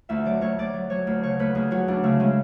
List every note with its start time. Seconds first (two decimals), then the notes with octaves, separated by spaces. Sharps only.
0.09 D2 E5
0.25 F#3 D5
0.41 D2 C#5
0.59 D2 D5
0.74 F#3
0.90 F#3 C#5
1.07 D2
1.23 C#3 C#5
1.39 D2 B4
1.55 D2 G#4
1.71 F#3 F#4
1.88 D2 D4
2.03 C#3 A3
2.20 C#3 G#3